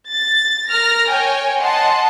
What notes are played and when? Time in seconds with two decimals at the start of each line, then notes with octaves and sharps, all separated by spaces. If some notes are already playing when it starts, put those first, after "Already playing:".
0.11 A6
0.70 A#4 F6 A#6
1.09 C#5 G5 G#5
1.61 D#5 F#5 A5 C6